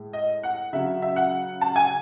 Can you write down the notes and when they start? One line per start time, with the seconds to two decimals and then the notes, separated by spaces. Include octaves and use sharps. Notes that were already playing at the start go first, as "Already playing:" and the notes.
Already playing: A2 G#3
0.13 D#5
0.43 F#5
0.73 C#3 F#3 E5
1.02 E5
1.16 F#5
1.61 A5
1.76 G#5